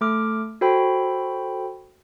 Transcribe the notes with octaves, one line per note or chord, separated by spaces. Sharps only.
A3 A4 D6 F6
F#4 A4 C5 G5 B5